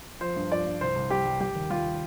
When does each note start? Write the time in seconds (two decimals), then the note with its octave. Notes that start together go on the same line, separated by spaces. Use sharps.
0.20 F3 C5
0.36 G2
0.51 F3 D5
0.66 G2
0.81 C2 C5
0.96 C2
1.10 G3 G4
1.25 G3
1.40 G3 G4
1.55 D#2
1.70 G3 F4